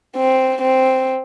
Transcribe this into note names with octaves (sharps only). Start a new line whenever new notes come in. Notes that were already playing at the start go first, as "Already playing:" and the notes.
C4
C4